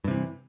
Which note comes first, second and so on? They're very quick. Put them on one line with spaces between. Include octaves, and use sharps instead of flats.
G2 C3 E3